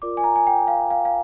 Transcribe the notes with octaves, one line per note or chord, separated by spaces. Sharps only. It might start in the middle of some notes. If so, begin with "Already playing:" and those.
F4 A#4 D5 D6
G#5
A#5
G#5
G5
F5
F5
F5